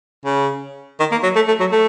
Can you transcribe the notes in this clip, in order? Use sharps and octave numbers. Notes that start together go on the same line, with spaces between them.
C#3
D#3
A#3
F#3
A3
A3
F#3
A3